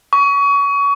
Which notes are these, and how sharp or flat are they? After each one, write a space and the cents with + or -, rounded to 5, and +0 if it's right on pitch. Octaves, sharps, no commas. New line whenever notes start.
C#6 +30